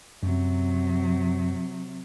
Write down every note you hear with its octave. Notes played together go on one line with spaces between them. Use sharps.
F#2 C3 F#3